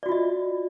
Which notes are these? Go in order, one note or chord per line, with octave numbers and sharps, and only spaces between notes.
F4 F#4 D5 D#5